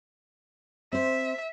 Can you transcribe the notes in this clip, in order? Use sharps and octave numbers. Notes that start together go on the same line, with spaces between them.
C4 C5 E5